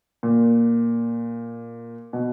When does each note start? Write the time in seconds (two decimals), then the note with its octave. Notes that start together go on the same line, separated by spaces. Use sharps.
0.23 A#2
2.13 B2